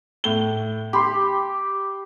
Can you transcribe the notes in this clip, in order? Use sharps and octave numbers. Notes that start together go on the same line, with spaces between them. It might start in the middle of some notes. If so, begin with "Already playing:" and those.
A2 G7
G4 B5 C6